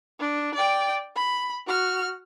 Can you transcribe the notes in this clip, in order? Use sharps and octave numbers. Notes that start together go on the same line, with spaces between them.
D4
D5 G5
B5
F#4 F6